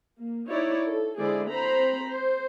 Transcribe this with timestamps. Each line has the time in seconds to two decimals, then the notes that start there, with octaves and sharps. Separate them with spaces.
0.19 A#3
0.50 D#4 E4 C#5 D5
0.88 A4
1.19 D3 G#3 E4 G#4 C5 D5
1.51 C4 C5 A#5 B5
2.07 C5